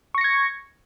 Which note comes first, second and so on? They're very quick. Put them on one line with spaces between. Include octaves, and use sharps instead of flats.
C#6 A#6 C#7 G#6